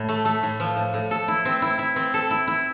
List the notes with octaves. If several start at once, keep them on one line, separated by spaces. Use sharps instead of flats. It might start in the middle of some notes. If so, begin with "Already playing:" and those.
Already playing: A2
A3
A3
A2
F3
A2
A2
A4
E4
C4
E4
E4
C4
A4
E4
E4